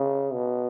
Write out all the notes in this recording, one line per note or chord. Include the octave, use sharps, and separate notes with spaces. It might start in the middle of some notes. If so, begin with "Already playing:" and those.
Already playing: C#3
B2